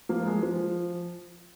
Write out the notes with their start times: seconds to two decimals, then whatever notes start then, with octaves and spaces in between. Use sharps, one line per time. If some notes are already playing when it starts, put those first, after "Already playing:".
0.09 F3 A#3
0.26 G#3
0.43 F3